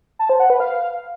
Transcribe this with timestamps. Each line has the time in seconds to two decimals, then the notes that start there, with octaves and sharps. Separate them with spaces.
0.19 A5
0.29 C5
0.40 F#5
0.50 B4
0.60 F5